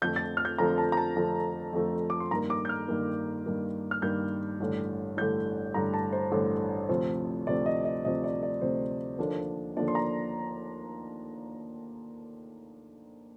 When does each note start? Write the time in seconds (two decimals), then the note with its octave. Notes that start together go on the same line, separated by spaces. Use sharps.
0.02 F2 D3 F3 A3 G6
0.16 A6
0.37 F6
0.45 G6
0.58 F2 D3 F3 A3 A#5
0.78 A5
0.92 A#5
0.97 A5
1.16 F2 D3 F3 A3
1.73 F2 D3 F3 A3
2.10 D6
2.20 C6
2.31 G2 D#3 A#3 A#5
2.50 D6
2.65 G6
2.69 F6
2.88 G2 D#3 A#3
3.46 G2 D#3 A#3
3.91 F6
4.02 G2 D#3 A#3 G6
4.60 A1 G2 D3
5.17 A1 G2 D3 G6
5.74 A1 G2 D3 A#5
5.94 A5
6.13 C5
6.32 A1 G2 D3
6.89 D2 C3 F3 C4
7.47 D2 C3 F3 C4 D5
7.66 D#5
7.85 D#5
8.04 D2 C3 F3 C4 D#5
8.24 D5
8.43 D5
8.61 D2 C3 F3 C4 C5
9.18 D#2 D3 F3 A#3 D4
9.77 D#2 D3 F3 A#3 D4 D5
9.88 C6
9.95 A#5